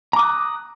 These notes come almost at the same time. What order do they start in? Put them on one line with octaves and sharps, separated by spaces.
A#5 D6 D#6 F#6